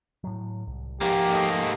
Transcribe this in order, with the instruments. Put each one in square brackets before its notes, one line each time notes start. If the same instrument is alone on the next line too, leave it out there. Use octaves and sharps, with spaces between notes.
[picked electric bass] A2 F#3
C2
[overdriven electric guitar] G#2 A#3 [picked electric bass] F3 [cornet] G4
[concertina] A3 D#4